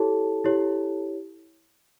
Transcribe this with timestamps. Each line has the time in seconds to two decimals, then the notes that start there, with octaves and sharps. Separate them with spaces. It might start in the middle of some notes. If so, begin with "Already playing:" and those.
Already playing: E4 G4 A4 C#5 A5
0.44 E4 G4 C#5